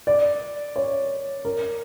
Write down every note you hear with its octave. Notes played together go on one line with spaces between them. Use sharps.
D5
C#5
A#4